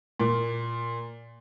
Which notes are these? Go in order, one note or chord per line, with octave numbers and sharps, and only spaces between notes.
A#2